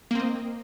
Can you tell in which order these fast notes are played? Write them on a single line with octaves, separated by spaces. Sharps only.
A#3 C4 D#5